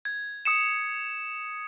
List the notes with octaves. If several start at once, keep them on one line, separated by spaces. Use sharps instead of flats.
G#6
D#6 C#7 E7